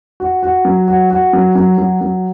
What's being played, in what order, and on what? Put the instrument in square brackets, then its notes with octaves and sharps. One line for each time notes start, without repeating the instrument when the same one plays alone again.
[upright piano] F#4
F#4
F#3
F#4
F#4
F#3
F#3
F#3
F#3